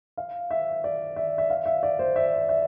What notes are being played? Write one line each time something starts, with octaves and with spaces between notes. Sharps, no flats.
F5
E5
D5
E5
E5
F5
E5
D5
C5
E5
E5